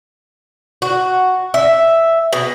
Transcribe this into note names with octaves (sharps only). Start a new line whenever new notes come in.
F#4
E5
B2